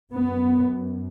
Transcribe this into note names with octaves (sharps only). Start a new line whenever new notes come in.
F#2 B3